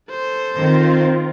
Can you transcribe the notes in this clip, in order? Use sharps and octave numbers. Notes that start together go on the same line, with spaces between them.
A4 C5
D#3 C4 F4